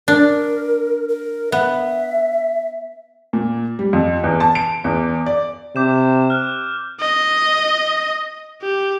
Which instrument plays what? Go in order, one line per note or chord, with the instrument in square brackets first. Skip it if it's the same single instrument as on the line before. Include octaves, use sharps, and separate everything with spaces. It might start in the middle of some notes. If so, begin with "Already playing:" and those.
[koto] D4 [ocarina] A#4
[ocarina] A#4
[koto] B3 [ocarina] E5
[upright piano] A#2
G3
F2
E2
A5
D7
E2
D5
[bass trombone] C3 [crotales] D6 G6 E7
[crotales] F6 F#6
[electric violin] D#5
G4